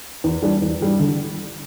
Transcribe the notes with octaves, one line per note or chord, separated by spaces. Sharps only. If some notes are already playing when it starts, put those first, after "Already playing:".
E2
E3 G3 D4
E2
E3 G3 D4
D3